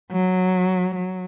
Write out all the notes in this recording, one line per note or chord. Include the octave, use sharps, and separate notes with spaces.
F#3
F#3